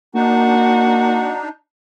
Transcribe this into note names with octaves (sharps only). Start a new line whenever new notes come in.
A#3 D4 D#4 F#4